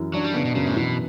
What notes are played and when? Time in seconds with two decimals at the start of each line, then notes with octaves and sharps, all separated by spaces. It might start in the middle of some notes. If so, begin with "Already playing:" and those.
Already playing: F#2 E3
0.14 F#3 D4
0.24 G3
0.34 C#3 B3
0.45 B2
0.55 F#2 C#3
0.66 A2
0.76 B2 E3